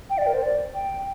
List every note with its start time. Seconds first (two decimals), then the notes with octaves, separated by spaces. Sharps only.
0.10 G5
0.18 D5
0.27 A#4
0.34 C5
0.43 D5
0.74 G5